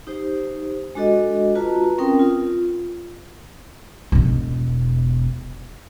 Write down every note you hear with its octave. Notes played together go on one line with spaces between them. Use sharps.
D#4 G4 C5
G#3 D4 F#4 A4 D#5
F4 F#4 B4 A5 A#5
C4 C#4 A#4 G5 D#6
F4
E1 B2